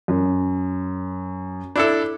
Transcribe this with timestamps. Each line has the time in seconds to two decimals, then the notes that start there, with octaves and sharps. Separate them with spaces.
0.08 F#2
1.76 D4 E4 A4